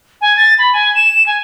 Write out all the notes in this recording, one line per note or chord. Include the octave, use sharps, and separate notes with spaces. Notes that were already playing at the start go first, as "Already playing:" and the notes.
G#5
A6
B5
G#5
E7
G#5